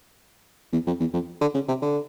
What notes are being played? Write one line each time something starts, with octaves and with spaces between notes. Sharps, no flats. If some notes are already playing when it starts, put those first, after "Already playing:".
E2
F2
E2
F2
D3
C#3
C3
D3